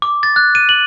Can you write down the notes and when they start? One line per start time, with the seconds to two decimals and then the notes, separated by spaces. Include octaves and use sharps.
0.02 D6
0.23 A6
0.36 F#6
0.55 D#7
0.69 F#7